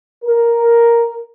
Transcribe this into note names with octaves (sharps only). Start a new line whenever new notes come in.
A#4